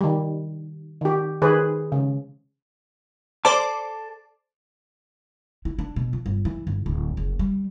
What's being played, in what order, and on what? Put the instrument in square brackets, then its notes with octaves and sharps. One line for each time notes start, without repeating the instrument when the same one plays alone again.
[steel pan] D#3 G3
D#3 G4
D#3 G#4 B4 C5
C#3
[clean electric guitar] A4 A5 [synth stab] C5 D5 D6
[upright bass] E4
D4
B2
F3
G1
E3
G1
D1
F#1
G3